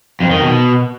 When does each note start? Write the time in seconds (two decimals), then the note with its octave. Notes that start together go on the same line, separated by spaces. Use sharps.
0.20 F2
0.31 D#3
0.41 B2